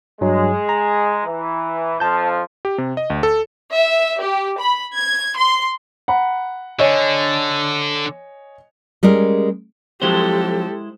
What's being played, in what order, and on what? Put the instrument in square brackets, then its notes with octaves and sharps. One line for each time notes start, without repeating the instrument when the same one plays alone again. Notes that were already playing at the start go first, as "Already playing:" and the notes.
[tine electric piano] G2 F#3 [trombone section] G#3
[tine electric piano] A#5
[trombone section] E3
[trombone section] F2 F3 [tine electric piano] A5 G6
[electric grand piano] G4
C3
D#5
D2
A4
[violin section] E5
G4
B5
G#6
C6
[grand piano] F#5 A#5 B5
[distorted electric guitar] D3 [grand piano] C#5 D#5 G#5
[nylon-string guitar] G3 G#3 C#4 A#4
[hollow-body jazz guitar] F3 F#3 C4 [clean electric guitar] G#3 E4 C5 [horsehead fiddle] G4 A4